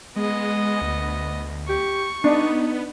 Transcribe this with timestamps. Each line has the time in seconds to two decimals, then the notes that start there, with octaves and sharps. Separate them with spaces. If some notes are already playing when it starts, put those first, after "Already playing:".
0.16 G#3 B3 D#5
0.82 D2
1.69 G4 C#6
2.24 B3 D4 D#4